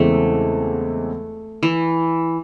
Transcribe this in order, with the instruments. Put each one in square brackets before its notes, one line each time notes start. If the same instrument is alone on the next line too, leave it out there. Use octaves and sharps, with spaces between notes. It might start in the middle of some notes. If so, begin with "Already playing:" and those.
Already playing: [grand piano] E2 C#3 E3 G#3 C4 [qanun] A3
[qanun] E3